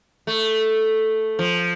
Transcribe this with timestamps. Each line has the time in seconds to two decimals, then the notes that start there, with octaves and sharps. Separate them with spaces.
0.27 A3
1.39 F3